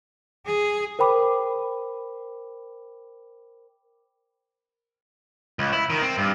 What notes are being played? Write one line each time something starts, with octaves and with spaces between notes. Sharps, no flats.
G#4
A#4 C5 G5 B5 D6
C#2
E4
D#3
C4
G2